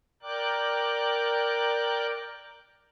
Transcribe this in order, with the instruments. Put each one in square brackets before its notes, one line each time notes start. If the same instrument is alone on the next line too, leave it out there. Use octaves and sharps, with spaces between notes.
[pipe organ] A#4 D5 G5 D6 F#6